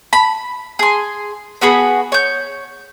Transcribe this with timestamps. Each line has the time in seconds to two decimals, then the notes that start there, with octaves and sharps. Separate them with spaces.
0.13 B5
0.79 G#4 C6
1.61 B3 F#4 G#4 B5
2.12 C#5 G6